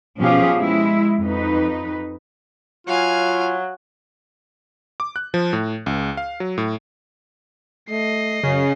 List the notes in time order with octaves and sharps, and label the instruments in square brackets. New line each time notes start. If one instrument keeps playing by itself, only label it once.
[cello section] B2 F3 C#4 G4 G#4 F5
G#3 E4
F2 D#4 B4
[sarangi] F#3 [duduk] F4 [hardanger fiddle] F5 G#5
[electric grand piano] D6
F#6
F3
A2
C#2
F5
F#3
A2
[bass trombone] A3 [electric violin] D#5 C7
[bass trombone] F#2 [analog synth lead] C#3